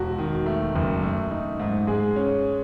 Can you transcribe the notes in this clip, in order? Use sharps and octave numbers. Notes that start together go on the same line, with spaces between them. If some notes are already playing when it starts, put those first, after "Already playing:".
Already playing: E1 F#4
D#3
A3
F#1
A3
D#4
G#2
G#3 G#4
C#4